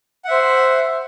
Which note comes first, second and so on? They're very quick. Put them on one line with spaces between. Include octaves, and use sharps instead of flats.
F#5 E5 C5